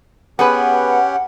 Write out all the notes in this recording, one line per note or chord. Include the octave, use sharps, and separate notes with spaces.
B3 C#4 G4 G#4 B4 F#5